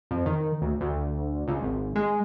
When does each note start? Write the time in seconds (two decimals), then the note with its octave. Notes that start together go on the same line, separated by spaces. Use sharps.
0.11 F2
0.26 D#3
0.61 D2
0.81 D2
1.47 C#2
1.62 G#1
1.96 G#3